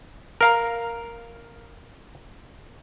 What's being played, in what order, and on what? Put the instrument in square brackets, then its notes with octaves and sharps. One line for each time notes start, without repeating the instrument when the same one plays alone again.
[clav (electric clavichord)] A#4 F5 A#5